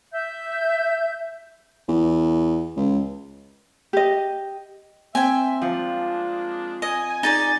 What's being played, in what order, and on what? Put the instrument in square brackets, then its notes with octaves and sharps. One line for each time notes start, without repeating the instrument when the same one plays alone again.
[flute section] E5 G6
[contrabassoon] E2
C#2
[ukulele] G4 D#5
[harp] C4 [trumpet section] E5 [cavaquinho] G5 G#5
[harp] F3 [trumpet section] G#3 A#3 D4
[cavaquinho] D#5 [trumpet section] G#5
[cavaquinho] D#4 G#4 D5 [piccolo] A6